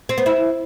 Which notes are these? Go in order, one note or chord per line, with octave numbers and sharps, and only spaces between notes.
C4
B3
E4